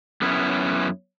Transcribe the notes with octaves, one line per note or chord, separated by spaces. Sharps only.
F#2 B3 C#4 E4